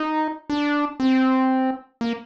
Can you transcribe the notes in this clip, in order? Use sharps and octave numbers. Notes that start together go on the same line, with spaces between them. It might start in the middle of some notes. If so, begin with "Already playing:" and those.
Already playing: D#4
D4
C4
A#3